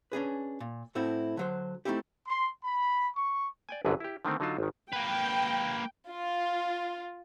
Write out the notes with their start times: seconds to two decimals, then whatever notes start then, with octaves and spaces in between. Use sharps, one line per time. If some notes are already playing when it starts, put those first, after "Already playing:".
0.12 C#4 D4 G#4 B4
0.60 A#2
0.95 A2 A3 C4 E4 F#4
1.37 D3 F#3 C5
1.85 A3 A#3 C4 D#4 E4 G4
2.26 C6
2.63 B5
3.15 C#6
3.69 D5 G5 G#5
3.85 G1 C2 F#2 D3 F#3 B4
4.00 E4 G4
4.25 D3 D#3 A3 C4
4.40 D3 F#3 D#4 F4 A5
4.58 G#1 D#3
4.93 A#3 B4 G5
6.09 F4